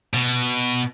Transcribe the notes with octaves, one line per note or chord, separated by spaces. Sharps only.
B2